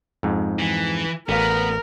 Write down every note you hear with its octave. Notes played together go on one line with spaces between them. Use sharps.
F2 G#2
E3
A1 B3 A#4 F5